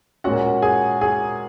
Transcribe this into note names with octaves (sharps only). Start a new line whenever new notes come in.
A#2 G#3 C#4 F#4 F#5
G#4 G#5
G#4 G#5